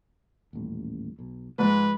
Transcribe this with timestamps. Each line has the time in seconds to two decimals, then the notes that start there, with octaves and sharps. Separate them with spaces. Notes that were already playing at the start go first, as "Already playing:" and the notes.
0.53 D#1 A1
1.19 B1
1.58 G#2 F3 F#3 G#3 B4